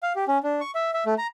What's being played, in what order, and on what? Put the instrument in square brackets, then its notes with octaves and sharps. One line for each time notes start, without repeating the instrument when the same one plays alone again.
[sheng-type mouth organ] F5
G4
C#4
D4
C#6
E5
E5
A3
A#5